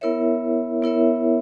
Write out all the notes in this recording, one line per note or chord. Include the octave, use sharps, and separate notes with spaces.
B3 E4 A#4 C#5 E5
B3 E4 A#4 C#5 E5